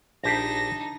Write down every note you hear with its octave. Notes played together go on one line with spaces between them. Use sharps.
A#1 D4 D#4 G4 C5 A#6